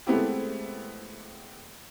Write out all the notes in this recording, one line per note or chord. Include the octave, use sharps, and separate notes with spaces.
G#3 A3 B3 C4 E4 G4